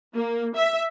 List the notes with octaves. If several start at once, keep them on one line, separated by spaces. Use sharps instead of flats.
A#3
E5